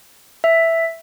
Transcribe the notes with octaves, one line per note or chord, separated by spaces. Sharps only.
E5